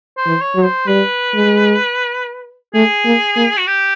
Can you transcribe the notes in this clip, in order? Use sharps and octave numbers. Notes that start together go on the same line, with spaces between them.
C5
E3
C#5
F#3
C5
G3 B4
G#3
A3 G#4
A#3
A#3
F#4
G4